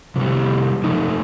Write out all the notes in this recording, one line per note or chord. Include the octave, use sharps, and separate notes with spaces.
F2 C3 G3
F2 F3 D#4